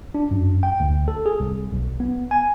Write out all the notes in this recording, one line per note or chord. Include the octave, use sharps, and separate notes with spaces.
D4
F#2
G5
D2
A4
G#4
C2
B1
B3
G#5